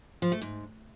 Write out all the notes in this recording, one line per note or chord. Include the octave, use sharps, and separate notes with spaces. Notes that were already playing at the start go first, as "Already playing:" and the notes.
F3
A3
G#2